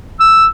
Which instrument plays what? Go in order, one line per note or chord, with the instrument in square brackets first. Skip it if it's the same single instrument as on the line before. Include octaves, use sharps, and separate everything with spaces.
[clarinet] E6